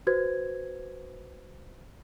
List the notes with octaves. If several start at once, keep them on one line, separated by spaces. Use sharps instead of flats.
F#4 B4 C5 G#6